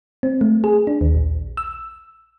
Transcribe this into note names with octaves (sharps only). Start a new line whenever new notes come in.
C4
A3
G#4
D4
D#2
A#1
E6